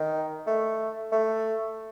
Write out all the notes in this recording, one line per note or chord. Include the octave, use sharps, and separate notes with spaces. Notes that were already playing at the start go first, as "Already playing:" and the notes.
Already playing: D#3
A3
A3